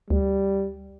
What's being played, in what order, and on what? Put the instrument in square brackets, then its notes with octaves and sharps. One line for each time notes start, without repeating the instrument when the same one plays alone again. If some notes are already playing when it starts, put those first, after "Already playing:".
[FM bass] D2 [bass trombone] G3